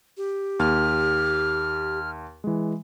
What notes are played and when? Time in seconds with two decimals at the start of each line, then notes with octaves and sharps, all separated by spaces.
0.17 G4
0.59 D#2 F6
2.44 E3 G#3